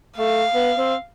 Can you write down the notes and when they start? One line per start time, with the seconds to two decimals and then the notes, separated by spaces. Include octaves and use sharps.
0.17 A3 F5
0.54 B3
0.78 C4